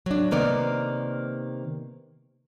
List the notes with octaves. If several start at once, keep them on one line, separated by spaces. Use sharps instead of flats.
F#3 D4
C3 D#3 A#3 B3 D5